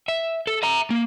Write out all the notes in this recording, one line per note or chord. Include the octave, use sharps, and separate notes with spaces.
E5
A4
E5 A#5
A#3